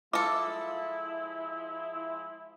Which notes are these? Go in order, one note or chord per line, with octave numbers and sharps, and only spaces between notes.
F3 G#3 E4 F4 A4 D6